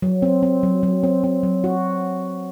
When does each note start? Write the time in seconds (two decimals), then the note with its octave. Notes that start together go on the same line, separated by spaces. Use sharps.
0.02 F#3
0.22 C4
0.43 C4
0.63 F#3
0.83 F#3
1.04 C4
1.24 C4
1.43 F#3
1.64 F#4